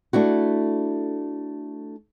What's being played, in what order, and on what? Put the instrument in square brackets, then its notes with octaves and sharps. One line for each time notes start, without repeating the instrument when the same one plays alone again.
[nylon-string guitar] A3 D4 E4 F#4